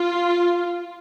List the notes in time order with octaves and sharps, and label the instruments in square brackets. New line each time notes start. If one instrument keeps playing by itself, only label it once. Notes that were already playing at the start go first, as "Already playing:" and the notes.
Already playing: [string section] F4